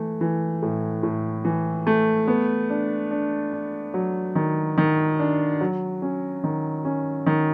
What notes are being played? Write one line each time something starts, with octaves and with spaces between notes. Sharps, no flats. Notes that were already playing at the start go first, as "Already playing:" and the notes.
Already playing: E3 A3
E3
A2
A2
E3
A3
B3
D4
D4
D4
F#3
D#3
D#3
D4
F#3
C#4
D#3
C#4
D#3